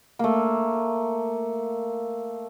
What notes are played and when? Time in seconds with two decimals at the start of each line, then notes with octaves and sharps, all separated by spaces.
0.19 A3 A#3